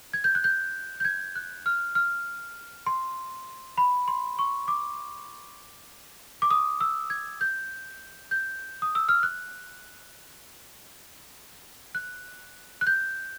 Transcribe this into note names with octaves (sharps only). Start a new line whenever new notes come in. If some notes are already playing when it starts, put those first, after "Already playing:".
G#6
G6
F#6
G6
G6
G#6
F#6
F6
F6
C6
B5
C6
C#6
D6
D6
D#6
E6
G#6
G6
G6
D#6
E6
F6
F#6
F#6
F#6
G6